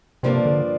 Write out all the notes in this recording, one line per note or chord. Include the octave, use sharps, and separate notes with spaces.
G2 C3 F3 A#3 D4
D3